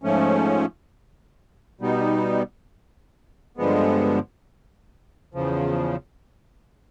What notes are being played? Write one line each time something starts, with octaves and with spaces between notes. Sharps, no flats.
G#2 F3 A3 C#4
B2 G3 B3 D#4
G2 D3 F3 G#3 B3
E2 C#3 F3